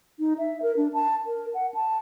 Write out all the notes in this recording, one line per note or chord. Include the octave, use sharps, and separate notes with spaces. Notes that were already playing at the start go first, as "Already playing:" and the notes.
D#4
E5
A#4
D4
A5
A#4
F#5
A5